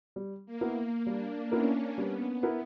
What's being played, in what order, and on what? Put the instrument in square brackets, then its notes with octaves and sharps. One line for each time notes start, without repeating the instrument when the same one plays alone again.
[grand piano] G3
[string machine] A#3
[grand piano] B3 E4 A#4
[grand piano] G3 [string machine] D4
[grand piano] B3 E4 A#4 [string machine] C#4
[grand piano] G3 [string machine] B3
[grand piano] B3 E4 A#4